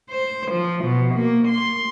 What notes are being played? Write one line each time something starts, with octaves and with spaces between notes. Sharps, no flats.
C5
F3
B2
A#3
C6